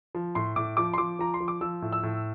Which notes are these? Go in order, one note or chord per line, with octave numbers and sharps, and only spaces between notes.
F3
A2 C6
A2 D6
F3 D6
C6
F3 D6
F3 A#5
C6
F3
D6
F3 E6
A2
E6
A2